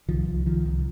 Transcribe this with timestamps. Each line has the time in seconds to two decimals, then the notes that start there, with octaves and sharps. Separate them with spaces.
0.08 C2 D#3 F3
0.27 C2
0.46 C2 D#3 F3
0.66 C2